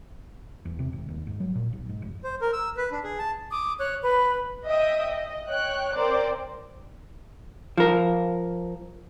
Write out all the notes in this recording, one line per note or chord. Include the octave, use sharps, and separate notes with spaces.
E2
C3
G#1
D#2
G#2
F#3
A#2
B1
G#2
F1
C5
A#4
E6
B4
D4
G#4
A5
D6 D#6
C#5 F#6
B4
D#5 E5 G5 D#6
D#5
C#5 G5 F#6
C4 A#4 C5 D5
F3 A#4